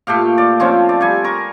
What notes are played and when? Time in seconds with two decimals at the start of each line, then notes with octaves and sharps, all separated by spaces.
0.07 A#2 A3 G4 F5
0.38 D5
0.60 F3 C4 C#4 F4
0.89 D5
1.01 G3 G#5
1.24 A#4 C#6